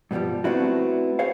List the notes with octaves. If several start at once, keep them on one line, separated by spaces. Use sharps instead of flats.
G2 B2 D#3 F3 G3
A3 B3 C4 D4 E4 F#4
G#4 C5 C#5 F5